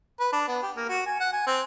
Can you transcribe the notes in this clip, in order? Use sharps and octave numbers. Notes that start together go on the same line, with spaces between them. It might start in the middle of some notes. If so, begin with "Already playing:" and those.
B4
D4
B3
G4
A#3
F#4
G#5
F#5
G#5
C4